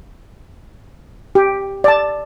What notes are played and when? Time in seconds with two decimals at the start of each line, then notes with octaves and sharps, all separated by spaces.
1.35 G4
1.84 D5 A5